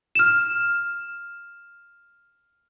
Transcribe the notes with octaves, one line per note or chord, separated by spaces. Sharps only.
F6 E7